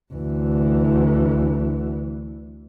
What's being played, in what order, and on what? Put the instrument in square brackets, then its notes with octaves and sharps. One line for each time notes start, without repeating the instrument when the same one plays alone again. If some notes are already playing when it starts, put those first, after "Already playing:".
[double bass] D2 E3